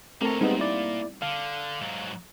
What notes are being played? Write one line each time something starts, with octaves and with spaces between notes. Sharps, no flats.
A3 A#3 C4 A4 A#4 C#5 A#5
A#2 G3 G#3 B3 C4 D#4
E4 D5
D3 F5
G#2 F#3